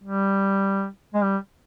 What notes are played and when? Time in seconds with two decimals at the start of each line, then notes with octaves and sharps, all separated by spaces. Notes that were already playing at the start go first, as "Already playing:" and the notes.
0.03 G3
1.14 G#3
1.23 G3